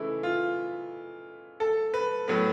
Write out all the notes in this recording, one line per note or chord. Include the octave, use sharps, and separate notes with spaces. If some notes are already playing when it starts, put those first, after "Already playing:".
Already playing: C#3 E3 A3 D#4 E4
F4
A4
B4
A2 F#3 B3 B4